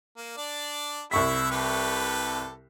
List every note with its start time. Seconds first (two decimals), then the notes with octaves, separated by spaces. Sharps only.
0.17 A#3
0.37 D4 D5
1.11 C2 E4 E5 C#6 B6
1.51 G4 A4 B4